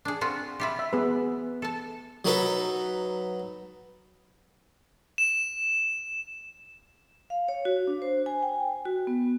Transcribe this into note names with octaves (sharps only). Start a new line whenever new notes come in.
D4 G#4
C4 F4 F#4
E4 F4 G4
E5
B3 G#4 B4
A4 A5
F#3 D#4 F#4 A4 B4
E7
F5
C#5
F#4
D4
C5
G#5
G5
F#4
B3